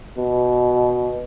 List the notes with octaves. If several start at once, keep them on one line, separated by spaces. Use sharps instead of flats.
B2